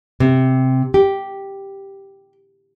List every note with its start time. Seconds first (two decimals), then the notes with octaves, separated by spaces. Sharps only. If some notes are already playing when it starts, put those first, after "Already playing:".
0.20 C3
0.94 G4